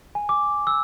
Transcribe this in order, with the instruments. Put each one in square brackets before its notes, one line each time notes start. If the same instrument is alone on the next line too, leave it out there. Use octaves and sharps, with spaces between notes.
[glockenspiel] G#5
D6
E6